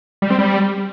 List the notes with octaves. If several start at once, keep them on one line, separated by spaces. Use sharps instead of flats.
G3
C4
G3